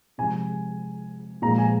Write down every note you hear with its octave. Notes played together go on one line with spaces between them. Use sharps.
C3 F3 G#3 G#5
A#2 F3 G#3 A#5
G#5